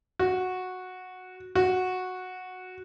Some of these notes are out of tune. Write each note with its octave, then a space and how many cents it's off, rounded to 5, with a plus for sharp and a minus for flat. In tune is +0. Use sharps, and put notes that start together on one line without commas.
F#4 -10
F#4 -10